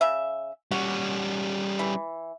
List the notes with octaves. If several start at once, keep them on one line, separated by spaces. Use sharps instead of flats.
C#3 E5
G3 C#4 F#4
E3